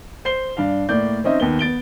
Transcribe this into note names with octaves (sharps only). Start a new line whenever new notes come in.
C5 C7 G7
G2 D4 F5
A2 A#3 D5 G6
C4 C#4 D#4 D#5 E5
D#2 B3 G7
B3 A6 D7 G7